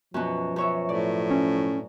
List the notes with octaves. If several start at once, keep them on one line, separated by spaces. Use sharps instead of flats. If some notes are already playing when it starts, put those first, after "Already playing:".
F#2 B2 F3
F#2 C#5 E5
A2 D5
C#4